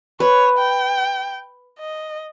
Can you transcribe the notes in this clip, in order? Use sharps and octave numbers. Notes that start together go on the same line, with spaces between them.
B4 C#5
G5
D#5